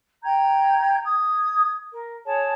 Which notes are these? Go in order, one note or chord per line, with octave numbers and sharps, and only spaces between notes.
G5 A#5 G6 G#6
D#6 G#6
A#4
G#4 C#5 A5